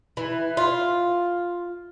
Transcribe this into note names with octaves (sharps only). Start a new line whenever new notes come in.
E3
F4